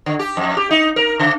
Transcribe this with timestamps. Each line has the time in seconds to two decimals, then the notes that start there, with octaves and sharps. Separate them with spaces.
0.06 D3
0.19 G4
0.37 F2
0.57 G4
0.71 D#4
0.96 A#4
1.19 C#3